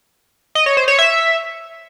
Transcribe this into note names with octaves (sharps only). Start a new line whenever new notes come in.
D#5
C#5
C5
C#5
E5